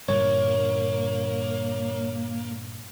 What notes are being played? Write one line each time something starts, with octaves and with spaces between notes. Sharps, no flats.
G2 A#2 D3 A#3 C#5